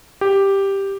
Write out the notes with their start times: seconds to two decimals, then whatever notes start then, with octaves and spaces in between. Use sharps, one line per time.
0.21 G4